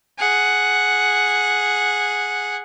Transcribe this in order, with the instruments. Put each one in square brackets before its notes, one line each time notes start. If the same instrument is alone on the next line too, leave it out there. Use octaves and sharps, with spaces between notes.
[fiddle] G#4 F#5